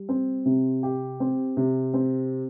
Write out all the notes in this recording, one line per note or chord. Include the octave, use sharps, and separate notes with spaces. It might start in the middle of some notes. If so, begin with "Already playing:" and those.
Already playing: G3
C4
C3
G4
C4
C3
C4